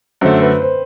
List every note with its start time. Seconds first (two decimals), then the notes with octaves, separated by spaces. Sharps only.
0.21 F#2 D3 A3 C5
0.42 B4
0.62 C5